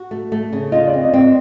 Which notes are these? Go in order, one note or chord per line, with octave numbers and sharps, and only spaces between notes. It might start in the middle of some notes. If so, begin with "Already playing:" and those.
Already playing: F#4
A3
A3
C#3
F4 D#5
D5
C4
D#5
C4
D5